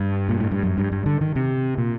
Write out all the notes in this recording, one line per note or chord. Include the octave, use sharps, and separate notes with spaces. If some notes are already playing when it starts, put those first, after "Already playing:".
Already playing: G2
A#2
A2
G2
F#2
G2
G2
D3
D#3
C3
A#2